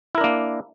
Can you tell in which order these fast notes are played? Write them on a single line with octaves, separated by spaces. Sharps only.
E4 A#4 D4 A#3